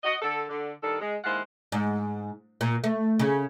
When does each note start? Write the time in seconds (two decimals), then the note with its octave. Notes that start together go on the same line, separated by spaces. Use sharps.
0.03 F#4 D#5
0.22 D3 A4
0.49 D3
0.82 G2 D#3 D4 A4
1.01 G#3
1.24 D#2 G#3 E4 C5 F5 F#5
1.72 G#2
2.61 A#2
2.84 A3
3.19 C#3